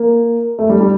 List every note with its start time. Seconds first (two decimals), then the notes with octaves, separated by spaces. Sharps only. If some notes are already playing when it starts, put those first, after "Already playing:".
Already playing: A#3
0.59 A3
0.69 G3
0.81 G3